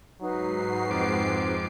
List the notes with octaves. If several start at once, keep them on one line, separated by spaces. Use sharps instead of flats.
G#2 F#3 D#4 F#4 B4 C7
F2 C4 D6